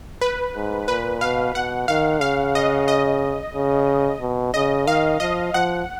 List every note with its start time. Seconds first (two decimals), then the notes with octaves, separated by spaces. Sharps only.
0.21 B4
0.55 G#2
0.88 A#2 B4
1.21 B2 F5
1.55 B2 F#5
1.88 D#3 F5
2.21 C#3 F5
2.55 D#5
2.88 D#5
3.55 C#3
4.21 B2
4.54 C#3 D#5
4.87 D#3 F5
5.20 F3 D#5
5.54 F3 F#5